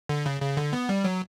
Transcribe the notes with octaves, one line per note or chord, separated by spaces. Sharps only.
D3
C#3
C#3
D3
B3
G3
F#3